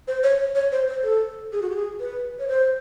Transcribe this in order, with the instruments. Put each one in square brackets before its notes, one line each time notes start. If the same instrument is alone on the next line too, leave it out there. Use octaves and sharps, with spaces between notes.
[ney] C5
C#5
C#5
C#5
C5
C5
A4
G#4
F#4
G4
G#4
B4
C#5
C5